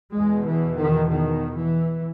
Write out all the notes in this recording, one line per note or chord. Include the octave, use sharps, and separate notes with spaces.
E2 B2 G#3
E3
D#3
D#3
E3